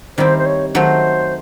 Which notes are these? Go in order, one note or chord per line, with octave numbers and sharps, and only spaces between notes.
D#3 G3 C4 E4 C5
C5
C#5
D#3 F#3 A3 C5